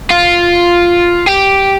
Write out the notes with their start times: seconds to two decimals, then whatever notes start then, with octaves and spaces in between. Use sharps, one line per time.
0.11 F4
1.27 G4